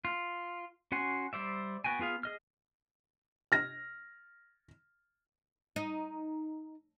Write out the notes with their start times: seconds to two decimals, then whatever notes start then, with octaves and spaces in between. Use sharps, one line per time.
0.05 F4
0.92 C#4 F#4 F#5 G#5 C6
1.33 G3 C5 D5 E5
1.84 B3 F#4 G5 G#5
1.99 B3 F4 G#4 F5
2.23 G#4 D#5 F6
3.52 F6 A#6
5.76 D#4